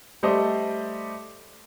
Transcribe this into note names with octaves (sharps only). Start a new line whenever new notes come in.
G3 A3 G4 C5 D5 D#5